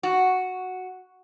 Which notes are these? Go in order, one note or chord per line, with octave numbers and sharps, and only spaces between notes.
F#4